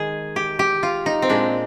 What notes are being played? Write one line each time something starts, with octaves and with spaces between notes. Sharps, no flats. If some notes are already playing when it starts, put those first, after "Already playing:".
Already playing: D#3 G#3 G#4
G4
G4
F4
D#4
C4
A#2 G#3 D4